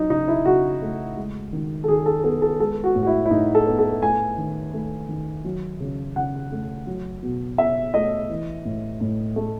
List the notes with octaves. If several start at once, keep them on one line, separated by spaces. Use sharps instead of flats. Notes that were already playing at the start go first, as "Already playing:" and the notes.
Already playing: F#3 D#4
C#3 D#4
E4
C#3 F#4
A3
G#3
D#3
A4
D#3 G#4
A4
B3 A4
A4
G#3 A4
F#4
A2
F#4
E4
E4
A2 D#4
A4
B3
A4
A3 G#5
D#3
A3
D#3
F#3
C#3
C#3 F#5
A3
F#3
B2
B2 E5
A3 D#5
E3
A2
A2
A3